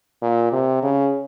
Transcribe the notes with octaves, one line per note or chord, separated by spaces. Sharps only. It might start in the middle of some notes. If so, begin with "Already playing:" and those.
A#2
C3
C#3